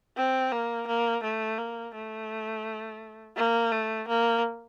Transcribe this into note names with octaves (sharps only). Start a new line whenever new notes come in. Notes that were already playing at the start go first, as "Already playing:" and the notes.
C4
A#3
A#3
A3
A#3
A3
A#3
A3
A#3